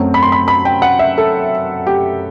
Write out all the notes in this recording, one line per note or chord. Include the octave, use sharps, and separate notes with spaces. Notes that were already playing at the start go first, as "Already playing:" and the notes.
Already playing: F#2 F#3 A3 C4
B5
C6
B5
B5
G5
F#5
E5
A4
G4